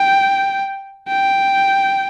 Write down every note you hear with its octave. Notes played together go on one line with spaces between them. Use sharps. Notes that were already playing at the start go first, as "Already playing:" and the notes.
Already playing: G5
G5